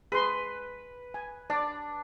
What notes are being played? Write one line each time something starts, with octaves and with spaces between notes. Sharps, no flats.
G#4 B4 C6
G#5
D4 D5